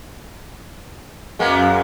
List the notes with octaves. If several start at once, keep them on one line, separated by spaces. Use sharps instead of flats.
F#2 G#3 A#3 B3